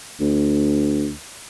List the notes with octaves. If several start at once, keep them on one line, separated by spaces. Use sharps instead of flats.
D2